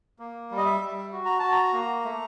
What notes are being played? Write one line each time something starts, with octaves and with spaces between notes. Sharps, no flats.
A#3
G3
D#5
E5
G3
F#4
A#5
F#4 A5
A#5
A#3
A3